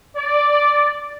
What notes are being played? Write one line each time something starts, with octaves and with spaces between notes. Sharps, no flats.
D5